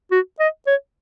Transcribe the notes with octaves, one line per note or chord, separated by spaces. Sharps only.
F#4
D#5
C#5